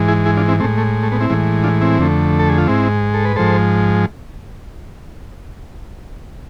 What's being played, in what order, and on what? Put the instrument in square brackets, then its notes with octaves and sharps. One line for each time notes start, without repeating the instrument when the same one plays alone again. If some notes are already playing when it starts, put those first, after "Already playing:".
Already playing: [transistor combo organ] G#2 E3 G#3
E4 G#4
E4 G#4
D4 F4
C4 E4
G#3 A3 C4
A2
A3
A3
B3
C4 E4
A2 E3 G#3
D4 F4
C4 E4
F2 D3 A3
A4
G#4
F4
G#2 G#3 C4 E4
A4
B4
G#2 F3 G#3 A4 C5